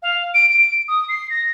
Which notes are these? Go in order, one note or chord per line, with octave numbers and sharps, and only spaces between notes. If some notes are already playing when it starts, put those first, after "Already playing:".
F5
D7
D7
D#6
C7
A#6